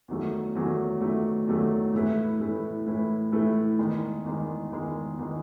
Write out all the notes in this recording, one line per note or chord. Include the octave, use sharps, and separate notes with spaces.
E2 D#3 F#3 A3
E2 D#3 F#3 A3
E2 D#3 F#3 A3
E2 D#3 F#3 A3
A2 E3 A3 E4 B4
A2 E3 A3 E4 B4
A2 E3 A3 E4 B4
A2 E3 A3 E4 B4
E2 D#3 G#3
E2 D#3 G#3
E2 D#3 G#3
E2 D#3 G#3